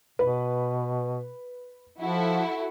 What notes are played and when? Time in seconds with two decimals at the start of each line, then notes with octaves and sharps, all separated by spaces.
0.19 B2 B4
2.01 F3 E4 F#4 A4